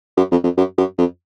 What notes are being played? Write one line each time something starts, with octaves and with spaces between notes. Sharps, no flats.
F#2
F2
F2
F#2
F#2
F2